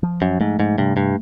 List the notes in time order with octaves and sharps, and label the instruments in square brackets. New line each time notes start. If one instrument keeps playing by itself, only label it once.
[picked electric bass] F3
[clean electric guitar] F#2
[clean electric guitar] G#2 [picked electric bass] A3
[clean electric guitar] G#2
[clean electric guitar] G2 [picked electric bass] C3
[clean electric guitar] G2